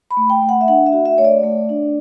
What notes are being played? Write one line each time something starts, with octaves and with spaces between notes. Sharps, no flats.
B5
A3
G5
A3
F#5
E5
D4 F#5
E5
F#4
E5
A3 C#5
D5
A3
D4